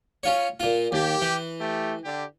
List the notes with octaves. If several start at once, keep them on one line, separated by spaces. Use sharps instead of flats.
C#4 F4 C#5
A#2 F4
D#2 G4
E3
A3 G4
D3 G4